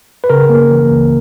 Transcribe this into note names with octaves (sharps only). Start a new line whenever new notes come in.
B4
C#3 A#4
A#3
E3
C#2